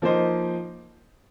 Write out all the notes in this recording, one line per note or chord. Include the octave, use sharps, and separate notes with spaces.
F3 A#3 D#4 C5 D#5